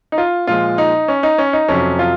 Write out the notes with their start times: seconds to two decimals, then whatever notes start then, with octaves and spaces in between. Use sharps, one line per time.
0.12 D#4
0.18 F4
0.47 A#2 F3 G#3 F4
0.78 D#4
1.08 C#4
1.23 D#4
1.38 C#4
1.53 D#4
1.68 F2 C3 F#3 C#4
1.99 F4